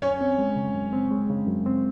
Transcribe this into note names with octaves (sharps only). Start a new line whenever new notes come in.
F#2 C#4 C#5
C4
G#3
C#3
F#2
C4
G#3
C#3
F#2
C4